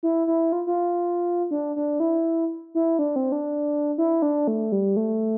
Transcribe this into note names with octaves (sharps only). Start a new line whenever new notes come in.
E4
E4
F4
F4
D4
D4
E4
E4
D4
C4
D4
E4
D4
A3
G3
A3